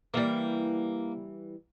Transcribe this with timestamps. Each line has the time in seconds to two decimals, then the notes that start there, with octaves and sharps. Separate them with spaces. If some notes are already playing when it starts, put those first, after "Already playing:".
0.14 E3 G3 A#3